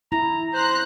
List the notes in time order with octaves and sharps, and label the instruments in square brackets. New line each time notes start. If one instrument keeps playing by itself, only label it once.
[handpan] E4 [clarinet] A#5
[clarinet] C5 [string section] A#5 C6 F#6